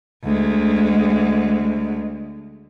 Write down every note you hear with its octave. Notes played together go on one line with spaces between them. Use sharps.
D2 G#3